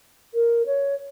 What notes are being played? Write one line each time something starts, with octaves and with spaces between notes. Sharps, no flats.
A#4
C#5